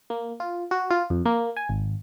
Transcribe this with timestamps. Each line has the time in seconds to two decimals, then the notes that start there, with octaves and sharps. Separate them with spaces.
0.10 A#3
0.40 F4
0.71 F#4
0.91 F4
1.10 F2
1.26 A#3
1.57 G#5
1.69 G#1